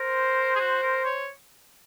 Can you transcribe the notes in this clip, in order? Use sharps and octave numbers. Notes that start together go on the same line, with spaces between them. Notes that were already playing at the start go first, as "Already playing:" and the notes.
Already playing: A#4 C5
G#4
F#4
A#4
C#5